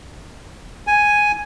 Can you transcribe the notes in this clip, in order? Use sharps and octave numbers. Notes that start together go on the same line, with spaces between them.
G#5